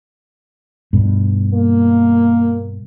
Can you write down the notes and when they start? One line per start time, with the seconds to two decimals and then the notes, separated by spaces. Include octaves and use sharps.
0.93 G2 B2
1.54 A#3